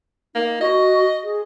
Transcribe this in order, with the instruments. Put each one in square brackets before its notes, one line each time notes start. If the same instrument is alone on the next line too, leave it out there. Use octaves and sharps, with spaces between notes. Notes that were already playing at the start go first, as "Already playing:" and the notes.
[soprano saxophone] A#3 [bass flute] D#4
[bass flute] F#4 [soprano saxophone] D#5
[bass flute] G#4